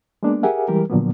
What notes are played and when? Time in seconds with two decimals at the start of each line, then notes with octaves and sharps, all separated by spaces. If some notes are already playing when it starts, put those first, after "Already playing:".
0.23 G#3 A#3 B3 D4
0.43 G4 G#4 A#4 E5 F#5 G#5
0.68 E3 G3 G#3 G4 A#4
0.90 A#2 D3 F3 F#3 A#3 B3